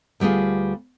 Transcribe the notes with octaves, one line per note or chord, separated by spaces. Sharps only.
D2 G3 B3 F4 G#4